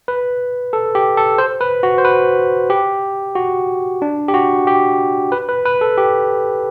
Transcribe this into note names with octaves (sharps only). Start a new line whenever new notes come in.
B4
A4
G4
A4
C5
B4
F#4
C5
B4
G4
F#4
D4
G4
F#4
G4
B4
B4
B4
A4
G4